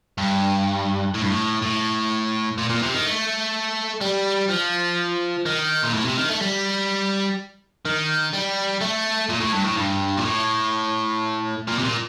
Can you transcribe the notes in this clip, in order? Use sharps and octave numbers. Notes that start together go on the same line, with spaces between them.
G2
A2
G2
A2
A2
A#2
A#2
C3
D#3
A3
G3
F3
D#3
A#2
A2
C3
D#3
A3
G3
D#3
G3
A3
A#2
A2
G2
A2
G2
A#2
A2
A#2
C3
A#2